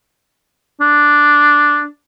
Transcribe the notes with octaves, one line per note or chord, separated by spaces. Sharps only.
D4